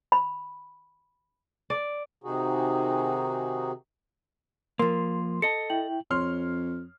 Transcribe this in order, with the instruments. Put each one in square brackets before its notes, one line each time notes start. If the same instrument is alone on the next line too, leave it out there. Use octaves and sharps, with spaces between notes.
[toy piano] B5
[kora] D5
[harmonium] C3 D#3 D#4 F#4 G#4
[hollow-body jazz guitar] F3 A#3 [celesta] A#4 [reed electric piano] C6
[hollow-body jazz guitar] A4 D#5 [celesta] A5 C#7
[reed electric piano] E4 G5 [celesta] F#7
[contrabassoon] F2 [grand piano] C#5 C6 F6